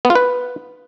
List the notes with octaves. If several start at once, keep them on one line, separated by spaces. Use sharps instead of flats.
B3
F4
B4